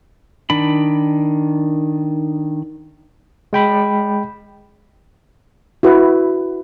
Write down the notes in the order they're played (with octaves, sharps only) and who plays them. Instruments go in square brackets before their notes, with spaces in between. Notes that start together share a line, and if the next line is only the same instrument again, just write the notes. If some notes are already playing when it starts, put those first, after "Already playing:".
[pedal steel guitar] D#3 D4 B5
[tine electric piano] G#3 G5 B5
[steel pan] E4 F#4 B4